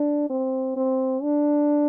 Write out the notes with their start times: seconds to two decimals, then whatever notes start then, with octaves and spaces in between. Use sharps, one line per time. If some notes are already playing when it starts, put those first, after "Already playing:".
Already playing: D4
0.30 C4
0.76 C4
1.23 D4